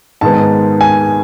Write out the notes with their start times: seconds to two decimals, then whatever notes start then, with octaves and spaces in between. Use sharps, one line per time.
0.21 G#2 D#3 G#3 B3 A5
0.81 G#5